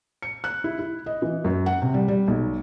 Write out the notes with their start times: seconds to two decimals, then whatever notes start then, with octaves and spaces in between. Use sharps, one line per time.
0.22 C#7
0.44 F#6
0.64 E4
0.79 E4
1.06 D#5
1.22 E3
1.44 F#2
1.66 F#5
1.82 C3
1.94 G3
2.08 G3
2.28 B1